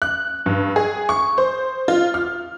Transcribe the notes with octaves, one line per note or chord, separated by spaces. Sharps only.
F#6
G2
G#4
C#6
C5
F4
F6